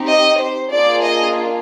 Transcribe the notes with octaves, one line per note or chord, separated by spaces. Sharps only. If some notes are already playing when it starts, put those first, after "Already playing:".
Already playing: C4 D#4 G4
D#5
C5
A#3 D4 F4 G#4 D5
D#5